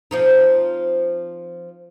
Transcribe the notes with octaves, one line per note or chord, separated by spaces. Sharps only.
F3 C4 D#4